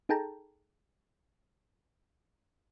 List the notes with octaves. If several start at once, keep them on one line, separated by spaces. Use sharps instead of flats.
D#4 G#4 A4 G5 A5 A#5